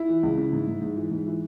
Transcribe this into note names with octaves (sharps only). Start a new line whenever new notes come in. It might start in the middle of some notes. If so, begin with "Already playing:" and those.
Already playing: E4
E3
C#2
C#3
G#2
G#2
G#2
E3
G#2
E3